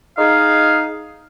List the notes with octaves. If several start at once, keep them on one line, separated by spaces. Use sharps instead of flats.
D#4 G#4 F5